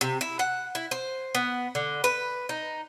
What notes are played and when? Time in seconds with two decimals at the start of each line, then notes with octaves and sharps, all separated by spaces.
0.01 C3
0.21 E4
0.39 F#5
0.75 E4
0.91 C5
1.35 B3
1.75 D3
2.04 B4
2.49 D#4